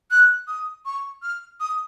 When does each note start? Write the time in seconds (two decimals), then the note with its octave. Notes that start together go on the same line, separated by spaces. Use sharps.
0.11 F#6
0.48 D#6
0.85 C#6
1.22 F6
1.60 D#6